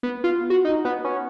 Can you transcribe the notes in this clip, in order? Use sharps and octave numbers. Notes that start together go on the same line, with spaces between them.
B3
F4
F#4
D#4
B3
C#4